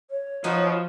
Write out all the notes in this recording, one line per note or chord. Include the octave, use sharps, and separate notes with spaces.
C#5
F3 B3 D#4 F#4